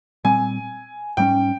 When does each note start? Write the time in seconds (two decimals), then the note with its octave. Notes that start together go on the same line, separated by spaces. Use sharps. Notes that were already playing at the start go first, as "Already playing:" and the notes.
0.24 A#2 G3 C4 G#5
1.17 G#2 G3 A#3 C#4 G5